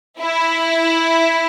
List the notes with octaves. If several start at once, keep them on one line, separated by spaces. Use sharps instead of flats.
E4